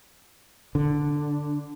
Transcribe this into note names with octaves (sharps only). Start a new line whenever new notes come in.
D3